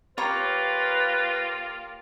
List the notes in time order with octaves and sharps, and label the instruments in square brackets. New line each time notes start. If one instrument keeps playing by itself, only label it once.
[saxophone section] A#3 F4 [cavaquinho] G4 C#5 A#5 [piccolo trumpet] B4